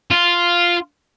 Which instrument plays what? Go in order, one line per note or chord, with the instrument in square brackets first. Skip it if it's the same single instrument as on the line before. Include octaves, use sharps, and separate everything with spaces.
[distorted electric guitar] F4